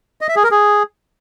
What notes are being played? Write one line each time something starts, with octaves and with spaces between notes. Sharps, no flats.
D#5
E5
G#4
A#4
G#4